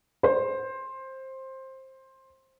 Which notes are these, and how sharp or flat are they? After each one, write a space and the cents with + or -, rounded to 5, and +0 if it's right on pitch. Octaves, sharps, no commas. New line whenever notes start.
C5 +15